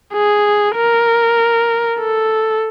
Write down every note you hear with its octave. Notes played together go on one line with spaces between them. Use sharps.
G#4
A#4
A4